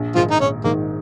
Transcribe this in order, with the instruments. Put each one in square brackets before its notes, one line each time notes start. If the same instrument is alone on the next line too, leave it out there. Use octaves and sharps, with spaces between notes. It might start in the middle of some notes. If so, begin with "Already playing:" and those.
Already playing: [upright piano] A#1
[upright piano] G#2 D#3 [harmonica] F3 F4
[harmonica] D#4
[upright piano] A#1 [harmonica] C#4
[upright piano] G#2 D#3 [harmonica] A#3